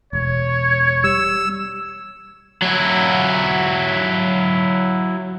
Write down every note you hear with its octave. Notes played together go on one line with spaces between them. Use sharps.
E1 C#5
G3 E6
F#3 E4